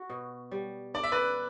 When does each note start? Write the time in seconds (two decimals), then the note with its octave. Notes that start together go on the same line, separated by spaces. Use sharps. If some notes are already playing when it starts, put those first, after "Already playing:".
Already playing: F#4
0.10 B2
0.51 G3
0.94 D4 D5
1.03 E5
1.12 B4 D5